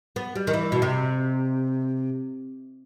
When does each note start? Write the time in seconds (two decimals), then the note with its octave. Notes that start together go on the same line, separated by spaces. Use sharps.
0.16 B3
0.36 G3
0.47 D#3
0.54 E3
0.72 B2
0.82 C3